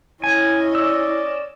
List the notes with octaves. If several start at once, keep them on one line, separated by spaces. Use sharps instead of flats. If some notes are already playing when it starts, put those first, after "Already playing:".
C#4 E4 D#5 G#5
D5 E6